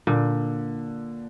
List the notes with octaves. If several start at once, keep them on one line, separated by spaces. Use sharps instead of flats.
A#2 D3